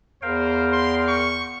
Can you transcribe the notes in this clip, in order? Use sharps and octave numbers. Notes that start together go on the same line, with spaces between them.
E2 A#4 C5 F5 G5
C6
C#6